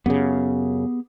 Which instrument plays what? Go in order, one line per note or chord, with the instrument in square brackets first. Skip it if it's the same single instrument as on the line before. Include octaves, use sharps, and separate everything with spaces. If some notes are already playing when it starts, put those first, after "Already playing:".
[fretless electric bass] F#2 C#3 [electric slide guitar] B3 G4 G#4